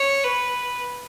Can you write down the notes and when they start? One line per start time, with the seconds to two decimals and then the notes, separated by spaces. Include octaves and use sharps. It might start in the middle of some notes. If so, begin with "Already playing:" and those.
Already playing: C#5
0.24 B4